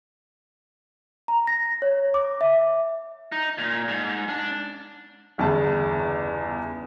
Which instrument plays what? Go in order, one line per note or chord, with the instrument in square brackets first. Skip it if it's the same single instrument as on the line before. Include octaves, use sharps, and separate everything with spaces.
[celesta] A#5
A#6
C#5
D6
E5
[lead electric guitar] D#4
A#2
G#2
D4
[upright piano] G1 E2 C#3 A5